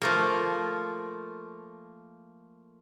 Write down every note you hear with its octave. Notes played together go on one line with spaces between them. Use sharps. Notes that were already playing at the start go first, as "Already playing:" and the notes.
F3 A3 A#3